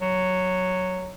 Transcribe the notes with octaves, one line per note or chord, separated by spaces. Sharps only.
F#3